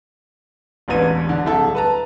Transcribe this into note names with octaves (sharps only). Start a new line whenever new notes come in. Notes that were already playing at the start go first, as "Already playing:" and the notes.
E1 A1 E2 E3 D#7
D3
D1 C2 E4 A4
B4 A5 A#5